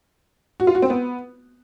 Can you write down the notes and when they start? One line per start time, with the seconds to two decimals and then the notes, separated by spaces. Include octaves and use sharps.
0.60 F#4
0.67 F4
0.75 F#4
0.82 C4
0.90 B3